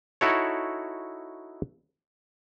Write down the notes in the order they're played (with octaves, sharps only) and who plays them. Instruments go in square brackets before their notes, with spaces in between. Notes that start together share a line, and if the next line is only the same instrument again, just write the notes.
[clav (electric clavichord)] D#4 E4 F#4 A4 C#5